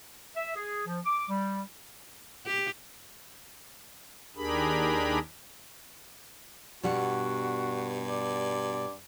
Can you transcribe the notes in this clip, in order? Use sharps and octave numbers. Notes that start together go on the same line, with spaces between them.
E5
G#4
F3
D6
G3
G4
D#2 D4 G4 G#4 A#4 B5
G2 B2 G3 F#4 F#5
D5